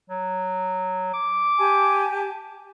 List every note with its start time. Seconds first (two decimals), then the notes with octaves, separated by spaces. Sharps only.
0.10 F#3
1.14 D6
1.59 G4 G#5 A5